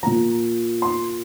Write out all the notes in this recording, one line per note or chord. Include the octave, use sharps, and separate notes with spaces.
A#2 F3 A#5
C6